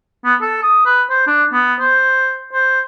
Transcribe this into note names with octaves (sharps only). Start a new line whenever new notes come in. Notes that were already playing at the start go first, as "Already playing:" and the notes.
B3
A4
D#6
B4
C5
D4
B3
C5
C5